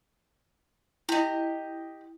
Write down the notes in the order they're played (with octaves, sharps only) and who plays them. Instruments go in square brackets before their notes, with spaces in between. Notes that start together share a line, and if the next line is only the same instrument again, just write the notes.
[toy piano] E4 [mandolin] G4 D#5